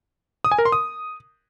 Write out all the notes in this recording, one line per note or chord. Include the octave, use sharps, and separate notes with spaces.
D#6
G#5
A#4
C6
D#6